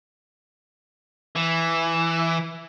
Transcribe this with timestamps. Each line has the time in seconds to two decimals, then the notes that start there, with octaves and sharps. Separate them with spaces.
1.36 E3